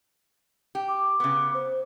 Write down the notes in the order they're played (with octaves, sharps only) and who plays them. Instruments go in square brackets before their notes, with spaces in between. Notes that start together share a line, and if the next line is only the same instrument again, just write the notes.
[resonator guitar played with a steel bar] G4
[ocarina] D6
[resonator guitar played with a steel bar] C#3 B3
[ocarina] C5